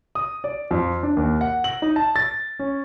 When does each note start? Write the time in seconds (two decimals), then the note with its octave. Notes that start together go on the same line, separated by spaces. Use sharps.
0.15 D#6
0.44 D5
0.71 F2
1.03 D4
1.17 D#2
1.41 F#5
1.64 F#7
1.82 D#4
1.96 A5
2.16 A6
2.59 C#4